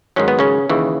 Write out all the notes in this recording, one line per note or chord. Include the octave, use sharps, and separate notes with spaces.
G#2 D#3 F#3 C#4
B3
C#3 C#4
D#2 C#3 E3